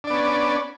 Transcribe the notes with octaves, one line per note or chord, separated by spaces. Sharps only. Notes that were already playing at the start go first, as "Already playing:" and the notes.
B3 C#4 D4 D5